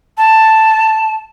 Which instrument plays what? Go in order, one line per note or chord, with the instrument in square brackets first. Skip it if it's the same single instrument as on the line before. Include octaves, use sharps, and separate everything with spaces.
[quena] A5